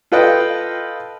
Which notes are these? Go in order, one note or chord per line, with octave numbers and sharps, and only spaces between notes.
F4 A4 B4 D#5 G5